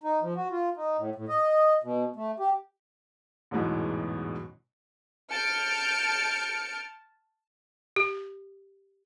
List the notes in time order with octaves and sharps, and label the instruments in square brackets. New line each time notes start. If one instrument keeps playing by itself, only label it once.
[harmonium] D#4
F3
F#4
F4
D#4
A2
A2
D#5
B2
A3
G4
[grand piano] A1 E2 G#2 B2 E3 F#3
[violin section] A5 F6 G6 C#7 D7
[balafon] G4